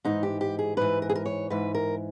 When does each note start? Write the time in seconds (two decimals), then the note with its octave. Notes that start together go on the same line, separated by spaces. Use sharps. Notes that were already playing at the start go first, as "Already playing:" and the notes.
0.05 G#2 E3 D#4
0.23 G4
0.41 G4
0.59 G#4
0.77 G#2 E3 B4
1.02 A#4
1.09 G#4
1.15 A#4
1.26 C#5
1.50 G#2 E3 B4
1.75 A#4